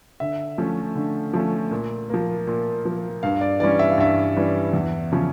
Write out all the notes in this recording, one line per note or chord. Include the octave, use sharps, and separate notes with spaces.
D3 E5
F3 A3 C#4
D3
F3 A3 C#4
A#2
F3 A#3
A#2
F3 A#3
G2 F5
D5
E3 G3 C#4 D5
E5
F5
G2 E5
E3 G3 C#4
E2
C#3 F3 C#4